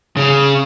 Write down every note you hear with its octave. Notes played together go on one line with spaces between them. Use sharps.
C#3